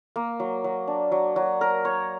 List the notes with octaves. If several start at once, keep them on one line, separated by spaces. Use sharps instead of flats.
A#3
F#3
F#3
D4
F#3
F#3
A#4
C#5